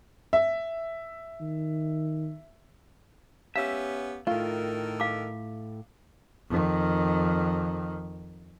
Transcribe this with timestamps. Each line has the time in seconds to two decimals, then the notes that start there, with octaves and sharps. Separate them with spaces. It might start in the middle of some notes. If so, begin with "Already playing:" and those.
0.33 E5
1.41 D#3
3.56 B3 C#4 G4 E5 F5 E6
4.27 A2 D#3 A3 F4 A4 A#4
5.00 F5 D6
6.49 F2 D#3